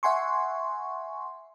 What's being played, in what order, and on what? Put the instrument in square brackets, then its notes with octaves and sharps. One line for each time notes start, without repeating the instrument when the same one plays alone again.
[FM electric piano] E5 F#5 G#5 C6 C#6